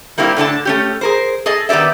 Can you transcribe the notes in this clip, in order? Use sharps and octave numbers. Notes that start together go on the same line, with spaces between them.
G3 A#3 C4 E4 G4
A2 D3 E4 A5
A3 C#4 G4
G#4 A#4 C5
G#4 A4 D#5
D#3 B3 G4 D5 E5